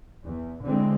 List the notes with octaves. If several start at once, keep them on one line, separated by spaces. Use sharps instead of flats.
E2
D3 E3 G#3 C4